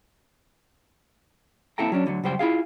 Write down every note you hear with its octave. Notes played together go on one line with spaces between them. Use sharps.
A#3 C4 E4 A4 G5 A#5
F#3 C#4 D4
D2 D3 D#3 F#3
C#2 F#2 G3 C5 G5
E4 F4 G#4 F5